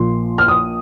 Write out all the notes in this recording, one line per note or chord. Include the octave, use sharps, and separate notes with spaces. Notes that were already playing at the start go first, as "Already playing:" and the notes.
Already playing: A#1 A#2 F3 C6
F6
D#6